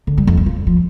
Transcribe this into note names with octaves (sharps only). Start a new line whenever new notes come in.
D3
G3
F2
G2
F3
F3